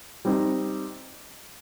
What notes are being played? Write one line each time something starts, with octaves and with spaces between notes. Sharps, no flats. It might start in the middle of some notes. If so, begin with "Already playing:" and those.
G3 C4 D#4